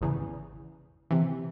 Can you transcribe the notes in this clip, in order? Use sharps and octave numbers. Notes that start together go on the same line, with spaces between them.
G#1 E2 C#3
C3 E3